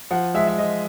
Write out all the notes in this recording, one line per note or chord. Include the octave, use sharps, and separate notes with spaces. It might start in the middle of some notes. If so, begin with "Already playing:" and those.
F3 F#5
G#3 E5
E5
F3 D#5